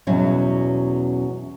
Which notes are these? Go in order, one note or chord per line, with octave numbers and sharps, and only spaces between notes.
E2 B2 F#3 C#4